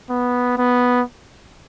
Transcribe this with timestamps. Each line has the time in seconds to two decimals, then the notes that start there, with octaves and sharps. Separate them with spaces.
0.10 B3
0.58 B3